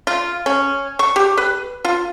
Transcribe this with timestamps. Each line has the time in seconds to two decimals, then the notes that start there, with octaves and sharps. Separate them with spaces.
0.07 F4
0.46 C#4
0.99 C#6
1.16 G4
1.37 B4
1.85 F4